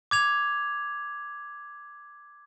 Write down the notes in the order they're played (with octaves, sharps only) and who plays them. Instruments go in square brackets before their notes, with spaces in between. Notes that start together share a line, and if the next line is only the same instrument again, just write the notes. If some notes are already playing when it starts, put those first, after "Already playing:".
[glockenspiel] D6 G#6 F7